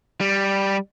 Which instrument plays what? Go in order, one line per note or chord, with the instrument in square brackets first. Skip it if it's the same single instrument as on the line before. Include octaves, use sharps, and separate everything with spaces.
[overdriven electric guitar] G3